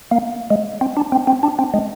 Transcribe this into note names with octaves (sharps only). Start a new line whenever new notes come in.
A#3
G#3
C4
D4
C4
C4
D4
C4
G#3